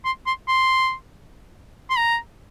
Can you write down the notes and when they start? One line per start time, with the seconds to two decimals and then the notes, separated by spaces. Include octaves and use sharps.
0.05 C6
0.26 C6
0.48 C6
1.90 C6
1.97 A#5